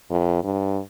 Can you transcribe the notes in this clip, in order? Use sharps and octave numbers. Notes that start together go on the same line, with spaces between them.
F2
G2